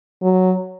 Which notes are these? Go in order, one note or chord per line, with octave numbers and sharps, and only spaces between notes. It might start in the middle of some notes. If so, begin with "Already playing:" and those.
F#3